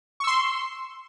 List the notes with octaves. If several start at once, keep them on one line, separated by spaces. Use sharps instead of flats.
C6 C#6 E6